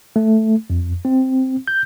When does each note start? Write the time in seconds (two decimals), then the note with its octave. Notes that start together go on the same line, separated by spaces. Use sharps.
0.16 A3
0.70 F2
1.05 C4
1.68 G6